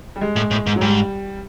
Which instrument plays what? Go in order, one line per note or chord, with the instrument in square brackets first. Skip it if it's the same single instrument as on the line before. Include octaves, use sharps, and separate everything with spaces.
[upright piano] G3
G#3
[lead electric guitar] A2
A2
G#2
[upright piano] F#3
[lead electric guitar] G#2 [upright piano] G3